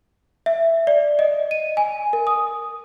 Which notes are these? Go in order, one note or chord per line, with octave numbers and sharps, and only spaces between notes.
E5
D5
D#5
D#7
G#5
A#4
D#6